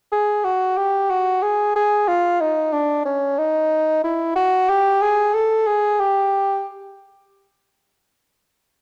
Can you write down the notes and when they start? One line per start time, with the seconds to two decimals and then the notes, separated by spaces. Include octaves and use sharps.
0.12 G#4
0.44 F#4
0.77 G4
1.10 F#4
1.43 G#4
1.76 G#4
2.08 F4
2.41 D#4
2.73 D4
3.06 C#4
3.38 D#4
4.04 E4
4.36 F#4
4.69 G4
5.02 G#4
5.34 A4
5.67 G#4
6.00 G4